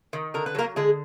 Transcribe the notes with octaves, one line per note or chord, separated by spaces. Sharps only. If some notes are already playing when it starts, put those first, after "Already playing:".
D#3
D3 A#4
B4
F#3 A#3 A#4
D3 G#3 G#4